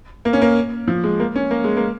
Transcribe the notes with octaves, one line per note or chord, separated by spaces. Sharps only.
A#3
C#4
A#3
F3
G#3
A#3
C#4
A#3
G#3
A#3